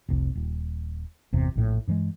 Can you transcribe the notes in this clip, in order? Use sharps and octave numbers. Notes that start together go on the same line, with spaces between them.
F1 C2
D#1
G1 E2 C3
A#1 A2
G2 E3 G3 G#3